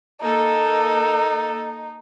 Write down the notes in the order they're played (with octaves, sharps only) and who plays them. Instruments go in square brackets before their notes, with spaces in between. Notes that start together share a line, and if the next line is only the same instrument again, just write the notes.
[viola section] A#3 A4 [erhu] D#4